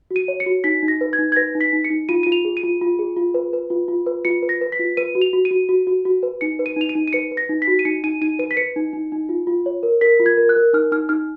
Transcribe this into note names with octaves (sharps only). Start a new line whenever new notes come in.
F#4
D#7
C#5
C#7
F#4
D#4 B6
D#4
A#6
B4
G#6
D#4
G#6
B4 A#6
D#4
B6
D#4
C#7
D#4
F4 D#7
F4 D#7
F7
G#4
D#7
F4
F4
G#4
F4
B4
B4
F4
F4
B4
F4 C#7
B4
A#6
B4
B6
F4
B4 D#7
F#4
F7
F#4
D#7
F#4
F#4
F#4
F#4
B4
D#4 C#7
B4
D#7
D#4 F7
D#7
D#4
D#7
B4 C#7
B4
A#6
D#4
B6
F#4
D#7
D#4 C#7
D#4 D#7
D#4 D#7
B4 D#7
B6
B4 C#7
D#4
D#4
D#4
F4
F4
C#5
A#4
A#4 B6
F4
G#6
A#4
F#6
A#4
D#4 F6
D#4 F6
D#4 F6